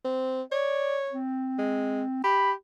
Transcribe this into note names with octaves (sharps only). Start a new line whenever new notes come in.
C4
C#5 D5
C4
G#3
G4 B5